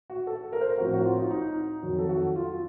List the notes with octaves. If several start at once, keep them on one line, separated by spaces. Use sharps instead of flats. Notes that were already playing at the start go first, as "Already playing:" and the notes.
F#4
A4
A#4
C5
A#4
A2 F3 C4 F#4
F#4
F4
D#4
D#4
F2 D#3 F#3
A4
F#4
F4